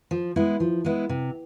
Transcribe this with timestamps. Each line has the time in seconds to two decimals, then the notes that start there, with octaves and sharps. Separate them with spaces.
0.11 F3
0.36 G#3 B3 E4
0.60 F3
0.85 G#3 B3 E4
1.09 C3